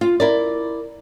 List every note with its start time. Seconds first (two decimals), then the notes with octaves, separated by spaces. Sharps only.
0.01 F4
0.20 E4 A#4 D5